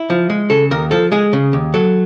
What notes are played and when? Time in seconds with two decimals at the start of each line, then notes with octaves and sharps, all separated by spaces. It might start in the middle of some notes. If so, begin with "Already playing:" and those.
Already playing: E4
0.10 F3
0.30 G#3
0.50 C#3 A4
0.71 D#2 A#4
0.91 F3 A4
1.12 G#3 G#4
1.33 C#3
1.53 D#2
1.74 F#3 A4